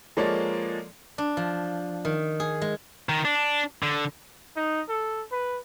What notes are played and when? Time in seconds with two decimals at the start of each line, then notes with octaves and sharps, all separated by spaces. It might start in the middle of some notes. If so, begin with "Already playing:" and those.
0.17 F3 G#3 A#3 A4 C#5 D5
1.18 D4
1.37 F3
2.05 D#3
2.40 G#4
2.62 G#3
3.09 D#3
3.25 D4
3.83 D3
4.56 D#4
4.89 A4
5.31 B4